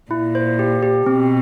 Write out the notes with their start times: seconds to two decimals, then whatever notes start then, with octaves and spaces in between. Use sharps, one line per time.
0.11 A#2 E4
0.35 C5
0.59 G4
0.83 G4
1.06 B2 C4